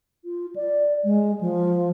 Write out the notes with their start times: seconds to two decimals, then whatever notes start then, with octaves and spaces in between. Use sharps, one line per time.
0.25 F4
0.55 D5
1.04 G#3
1.41 F3